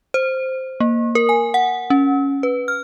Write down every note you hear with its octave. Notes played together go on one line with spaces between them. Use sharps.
C5
A#3
A#4
G#5
F#5
C#4
B4
F6